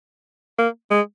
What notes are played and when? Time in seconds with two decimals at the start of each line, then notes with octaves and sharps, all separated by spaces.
0.58 A#3
0.91 G#3